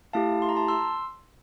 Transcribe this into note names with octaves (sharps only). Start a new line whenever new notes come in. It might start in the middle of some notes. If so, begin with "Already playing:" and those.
A3 E4 G4 F5 A5
C6
A#5
A5 C6
C6 E6